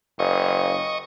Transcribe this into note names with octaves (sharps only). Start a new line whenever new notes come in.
F#1 D#5 C#6